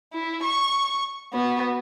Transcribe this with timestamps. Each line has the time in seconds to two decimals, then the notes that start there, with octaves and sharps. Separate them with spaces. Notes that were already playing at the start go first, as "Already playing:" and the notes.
0.13 E4
0.44 C#6
1.33 B3 F#4